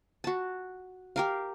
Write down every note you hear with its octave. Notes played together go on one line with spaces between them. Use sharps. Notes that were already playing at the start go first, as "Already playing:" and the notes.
F#4 A5
G4 A#4 F5